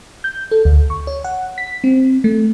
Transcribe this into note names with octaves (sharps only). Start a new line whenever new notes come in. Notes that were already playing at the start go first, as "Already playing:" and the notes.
G6
A4
D2
C#6
C#5
F#5
B6
C4
A3